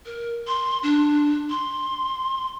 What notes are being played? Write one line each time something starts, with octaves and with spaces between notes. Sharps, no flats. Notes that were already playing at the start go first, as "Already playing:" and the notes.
A#4
C6
D4
C6